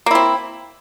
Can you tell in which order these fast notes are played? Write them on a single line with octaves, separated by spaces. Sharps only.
A#3 E4 C4